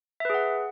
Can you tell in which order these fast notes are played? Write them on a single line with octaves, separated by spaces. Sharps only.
E5 B4 G#4 F#5